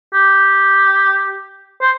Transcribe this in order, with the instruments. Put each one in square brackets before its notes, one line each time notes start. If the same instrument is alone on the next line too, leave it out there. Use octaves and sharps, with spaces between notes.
[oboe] G4
C5